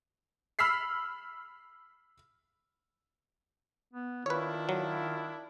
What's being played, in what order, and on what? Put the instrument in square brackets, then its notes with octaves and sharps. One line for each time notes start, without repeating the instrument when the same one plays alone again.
[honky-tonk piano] B5 E6 F6 B6 C7
[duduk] B3
[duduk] D#3 [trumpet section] D4 E4 [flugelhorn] F4 [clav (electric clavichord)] B4 C#5
[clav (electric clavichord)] F#3